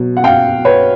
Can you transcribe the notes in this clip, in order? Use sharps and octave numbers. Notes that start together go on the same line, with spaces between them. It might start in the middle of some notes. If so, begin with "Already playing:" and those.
Already playing: B2 F#3
F#5
F5 G5
B4 C#5